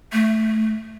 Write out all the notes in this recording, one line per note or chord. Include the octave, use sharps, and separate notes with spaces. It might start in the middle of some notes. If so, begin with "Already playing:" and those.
A3